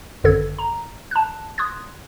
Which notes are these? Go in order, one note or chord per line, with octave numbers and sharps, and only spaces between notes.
G#1 F#2 D3 A4 G#6
A#5
A5 F#6
C6 D#6 F#6 G#6